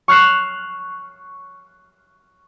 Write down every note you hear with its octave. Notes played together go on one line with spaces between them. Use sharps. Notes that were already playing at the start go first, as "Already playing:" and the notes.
C#6 F6 F#6 C7 E7